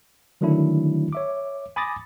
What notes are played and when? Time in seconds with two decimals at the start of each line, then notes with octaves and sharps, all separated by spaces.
0.41 D3 D#3 F#3 A3 D4 E4
1.13 C#5 E5 D6
1.76 G#5 B5 D6 D#6 A6 A#6